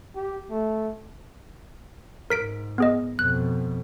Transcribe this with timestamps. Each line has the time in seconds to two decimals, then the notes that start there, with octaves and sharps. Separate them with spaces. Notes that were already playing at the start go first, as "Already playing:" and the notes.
0.16 G4
0.50 A3
2.30 G#2 A#4 B6 D7
2.78 B3 G#4 D#5
3.19 F2 B2 F#6